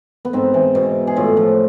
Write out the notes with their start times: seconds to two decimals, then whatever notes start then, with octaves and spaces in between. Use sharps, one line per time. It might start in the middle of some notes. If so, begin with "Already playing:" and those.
0.25 B3
0.33 G#2 C4
0.54 E3
0.75 B2
1.07 G#4
1.16 A2 F4
1.37 F3